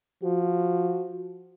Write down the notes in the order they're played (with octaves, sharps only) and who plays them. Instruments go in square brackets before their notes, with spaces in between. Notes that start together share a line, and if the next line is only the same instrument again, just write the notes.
[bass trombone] F3 [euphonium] F#4